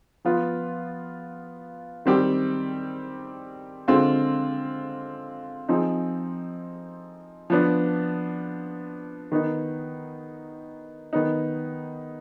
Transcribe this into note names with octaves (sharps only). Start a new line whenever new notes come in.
F3 B3 F4
D#3 G3 C4 G4
D3 G#3 C4 F4
F3 C4 D#4 G#4
F3 B3 D4
D#3 B3 D#4
D#3 B3 D#4